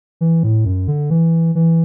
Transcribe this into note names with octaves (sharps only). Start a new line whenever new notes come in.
E3
A2
F#2
D3
E3
E3